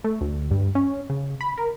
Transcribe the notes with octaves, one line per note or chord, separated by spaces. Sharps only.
A3
D2
G2
C#4
C#3
B5
A#4